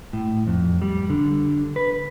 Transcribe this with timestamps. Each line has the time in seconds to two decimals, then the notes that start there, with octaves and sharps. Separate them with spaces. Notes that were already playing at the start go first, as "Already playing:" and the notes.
0.13 A2
0.47 F2
0.82 G3
1.10 D3
1.76 B4